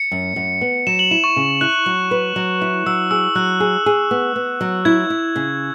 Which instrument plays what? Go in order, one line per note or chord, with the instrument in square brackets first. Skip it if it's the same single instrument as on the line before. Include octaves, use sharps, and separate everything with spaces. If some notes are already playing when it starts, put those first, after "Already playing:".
Already playing: [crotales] C#7
[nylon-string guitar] F#2
F#2
B3
[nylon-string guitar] F#3 [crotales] E7
[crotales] F#7
[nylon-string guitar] E4 [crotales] E7
[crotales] C#6
[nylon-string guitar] C#3
[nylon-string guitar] E4 [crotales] F#6
[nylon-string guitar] F#3
B4
F#3
E4
[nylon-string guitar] F#3 [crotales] E6
[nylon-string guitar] G#4 [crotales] E6
[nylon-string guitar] F#3 [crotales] F#6
[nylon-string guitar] G#4
G#4
B3
B3
F#3
[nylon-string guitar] E4 [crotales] G#6
[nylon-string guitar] E4
C#3